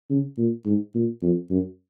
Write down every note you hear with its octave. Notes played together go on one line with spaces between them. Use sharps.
C#3
A#2
G#2
A#2
F2
F#2